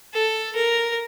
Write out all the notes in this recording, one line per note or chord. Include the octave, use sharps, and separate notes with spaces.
A4
A#4